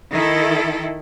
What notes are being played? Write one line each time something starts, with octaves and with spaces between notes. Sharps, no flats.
D#3 E4 A4